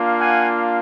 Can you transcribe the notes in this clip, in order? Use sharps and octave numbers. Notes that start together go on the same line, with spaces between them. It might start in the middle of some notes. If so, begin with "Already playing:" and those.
Already playing: A#3 D4 F4
F#5 G#5